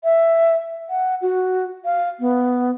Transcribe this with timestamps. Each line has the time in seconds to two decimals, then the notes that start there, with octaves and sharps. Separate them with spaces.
0.04 E5
0.90 F#5
1.22 F#4
1.85 F5
2.20 B3